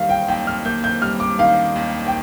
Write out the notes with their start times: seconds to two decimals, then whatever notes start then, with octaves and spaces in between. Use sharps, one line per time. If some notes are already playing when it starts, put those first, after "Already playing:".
Already playing: D#2 D#3 G3 F5
0.09 G5
0.28 D#2 G5
0.47 F6
0.65 A#3 G6
0.84 G6
1.02 G3 F6
1.20 D6
1.39 D#3 F5
1.76 D#2
2.06 G5